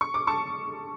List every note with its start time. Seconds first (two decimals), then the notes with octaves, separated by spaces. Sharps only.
0.01 C#6
0.14 D6
0.27 A5 C#6